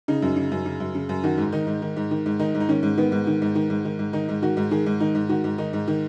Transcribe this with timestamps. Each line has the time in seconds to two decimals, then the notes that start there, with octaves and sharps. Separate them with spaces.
0.08 C#3 D#4
0.22 F#2
0.37 C#3
0.52 F#2
0.66 C#3
0.80 F#2
0.95 C#3
1.09 F#2
1.24 D#3 F#4
1.38 G#2
1.52 D#3 D#4
1.67 G#2
1.82 D#3
1.96 G#2
2.11 D#3
2.26 G#2
2.39 D#3 D#4
2.54 G#2
2.60 D#4
2.69 D#3 C#4
2.83 G#2
2.98 D#3 B3
3.12 G#2
3.27 D#3
3.42 G#2
3.55 D#3
3.70 G#2
3.85 D#3
3.99 G#2
4.13 D#3 D#4
4.29 G#2
4.42 D#3 F#4
4.57 G#2
4.71 D#3 G#4
4.86 G#2
5.00 D#3 D#4
5.15 G#2
5.29 D#3 F#4
5.44 G#2
5.58 D#3 D#4
5.73 G#2
5.88 D#3